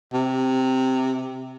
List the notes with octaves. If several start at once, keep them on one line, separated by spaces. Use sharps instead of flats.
C3